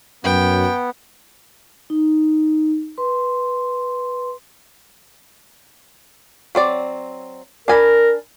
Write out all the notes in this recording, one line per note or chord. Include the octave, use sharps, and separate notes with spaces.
F#2 B3 G5
D#4
B4 C6
F#3 C4 D5
D4 A#4 G#5 B5